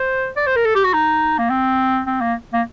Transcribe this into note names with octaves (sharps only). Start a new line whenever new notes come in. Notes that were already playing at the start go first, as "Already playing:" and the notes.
Already playing: C5
D5
C5
A#4
A4
G4
F#4
D#4
A#3
C4
C4
A#3
A#3